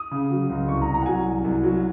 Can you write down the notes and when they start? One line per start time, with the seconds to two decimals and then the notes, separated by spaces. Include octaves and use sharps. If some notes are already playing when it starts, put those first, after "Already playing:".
Already playing: D#6
0.11 C#3
0.30 F#3
0.50 C#2
0.68 C2 C#6
0.82 A#5
0.87 C2
0.94 A#5
1.02 F#5
1.06 F#3 G#5
1.25 C2
1.44 C2
1.63 F#3